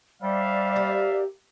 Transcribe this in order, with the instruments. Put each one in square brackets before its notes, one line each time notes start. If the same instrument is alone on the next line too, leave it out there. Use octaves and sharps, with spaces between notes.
[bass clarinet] G3 [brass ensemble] C5 E5 F5 [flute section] D5
[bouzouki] A#3 G4